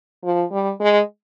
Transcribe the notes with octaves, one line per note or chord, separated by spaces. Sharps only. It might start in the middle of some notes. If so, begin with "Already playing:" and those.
F3
G3
G#3